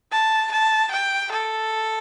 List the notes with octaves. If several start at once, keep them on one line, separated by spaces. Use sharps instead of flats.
A5
A5
G5
A4